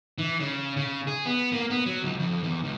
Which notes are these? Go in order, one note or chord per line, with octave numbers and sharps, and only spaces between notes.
E3
C#3
C#3
G#4
B3
A#3
B3
F#3
C#2
F2
E2
C#2